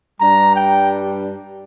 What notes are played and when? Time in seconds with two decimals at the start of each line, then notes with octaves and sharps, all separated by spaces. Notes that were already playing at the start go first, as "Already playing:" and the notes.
0.20 G2 G3 D4 A#5
0.54 G5